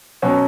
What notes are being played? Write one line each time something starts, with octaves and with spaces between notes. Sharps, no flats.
B2 F#3 C#4